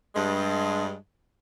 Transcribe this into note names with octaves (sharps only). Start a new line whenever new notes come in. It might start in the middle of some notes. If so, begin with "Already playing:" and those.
G2 G#3